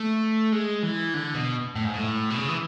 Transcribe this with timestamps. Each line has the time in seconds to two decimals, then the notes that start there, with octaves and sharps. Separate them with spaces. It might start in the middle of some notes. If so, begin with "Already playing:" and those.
Already playing: A3
0.52 G#3
0.83 E3
1.14 D3
1.34 B2
1.75 A2
1.85 G#2
1.94 A2
2.30 B2
2.37 C#3
2.49 E3